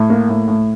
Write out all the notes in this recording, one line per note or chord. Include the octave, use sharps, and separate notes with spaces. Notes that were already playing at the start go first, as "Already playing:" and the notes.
Already playing: A2
A#3
A2
A2